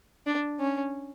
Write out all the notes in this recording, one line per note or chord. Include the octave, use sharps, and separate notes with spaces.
D4
C#4